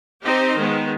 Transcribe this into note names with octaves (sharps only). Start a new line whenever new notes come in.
C4 D#4 G4 C5
D#3 G#3 B3